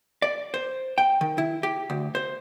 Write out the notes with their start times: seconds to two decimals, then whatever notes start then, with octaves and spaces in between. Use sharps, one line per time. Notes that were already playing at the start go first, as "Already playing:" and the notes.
0.22 D5
0.54 C5
0.98 G5
1.21 D#3
1.38 E4
1.63 G4
1.90 D2
2.15 C5